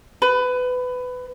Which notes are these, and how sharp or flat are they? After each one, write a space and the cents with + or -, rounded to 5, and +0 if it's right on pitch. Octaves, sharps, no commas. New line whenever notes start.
B4 +20